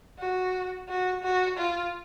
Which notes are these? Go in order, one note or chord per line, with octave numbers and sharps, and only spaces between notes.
F#4
F#4
F#4
F4